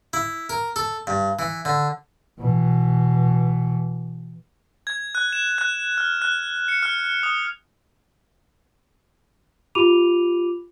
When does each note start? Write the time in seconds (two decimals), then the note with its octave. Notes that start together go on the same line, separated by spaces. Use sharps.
0.13 E4
0.49 A#4
0.76 A4
1.07 G2
1.39 E3
1.65 D3
2.39 B2 E3
4.87 G#6
5.15 F#6
5.33 E7
5.58 F#6
5.98 F6
6.22 F#6
6.68 C#7
6.83 F6
7.23 D#6
9.75 F4 G4 B5 D6 D#7 F7